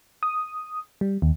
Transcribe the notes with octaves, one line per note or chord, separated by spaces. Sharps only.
D#6
G3
D#2